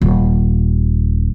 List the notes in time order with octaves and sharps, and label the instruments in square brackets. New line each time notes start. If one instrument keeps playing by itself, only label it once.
[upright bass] D#1